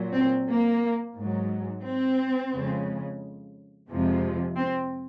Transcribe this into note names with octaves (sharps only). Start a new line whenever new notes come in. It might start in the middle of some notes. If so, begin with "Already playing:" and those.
Already playing: A#2 F#3
C4
A#3
G#2 F#3
C4
F2 C#3 G#3
F2 C3 F3 G#3
C4